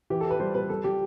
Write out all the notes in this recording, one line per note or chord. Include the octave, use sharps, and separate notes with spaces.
E3 G4
A4
E3
B4
G3 C5
G3 B4
G3 A4
G3 G4